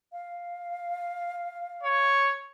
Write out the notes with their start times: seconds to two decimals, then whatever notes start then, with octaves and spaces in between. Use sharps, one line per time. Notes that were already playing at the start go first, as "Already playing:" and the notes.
0.12 F5
1.83 C#5